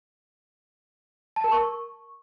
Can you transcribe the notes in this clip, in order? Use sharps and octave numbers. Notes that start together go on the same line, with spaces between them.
A5
A#4
C#6